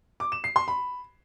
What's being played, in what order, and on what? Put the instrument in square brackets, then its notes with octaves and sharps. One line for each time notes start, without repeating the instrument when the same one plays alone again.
[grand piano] D6
E7
C7
C6
B5